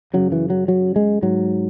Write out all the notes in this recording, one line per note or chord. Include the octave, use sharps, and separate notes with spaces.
F#2 C#3 F#3
E3
F#3
F#3
G#3
G#2 F#3